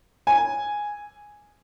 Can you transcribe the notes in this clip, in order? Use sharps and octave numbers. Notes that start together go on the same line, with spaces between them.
G#5